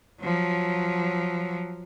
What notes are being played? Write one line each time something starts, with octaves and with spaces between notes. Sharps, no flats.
F3 F#3